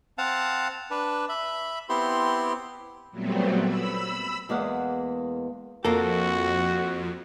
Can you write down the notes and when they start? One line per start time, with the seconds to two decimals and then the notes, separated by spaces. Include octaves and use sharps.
0.18 C4 F5 F#5 A5
0.91 D4 B4
1.29 E5 B5
1.89 B3 C4 E4 G4 C6
3.11 A#2 F#3 G3 A3 B3 C4
3.63 B5 E6
4.49 E2 G#3 A#3 B3 F5 F#5
5.85 F2 A#3 F#4 A4